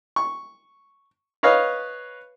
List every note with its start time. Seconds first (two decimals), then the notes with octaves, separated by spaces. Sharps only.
0.16 C#6
1.43 B4 C#5 D#5 F5